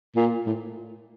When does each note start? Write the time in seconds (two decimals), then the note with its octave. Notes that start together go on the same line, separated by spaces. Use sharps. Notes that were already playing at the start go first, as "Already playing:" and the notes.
0.16 A#2
0.47 A2